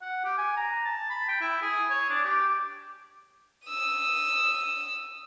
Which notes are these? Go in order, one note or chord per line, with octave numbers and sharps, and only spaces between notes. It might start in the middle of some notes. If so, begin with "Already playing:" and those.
F#5
G4
G#5
A#5
A5
B5
G5
E4
G#4
C#5
D4
G4
D#6 E6